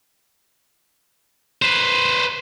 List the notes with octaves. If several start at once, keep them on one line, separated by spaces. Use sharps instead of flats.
B4 C5